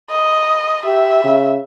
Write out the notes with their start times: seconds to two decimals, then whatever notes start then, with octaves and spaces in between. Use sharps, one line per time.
0.11 D#5
0.86 G4 E5
1.24 C#3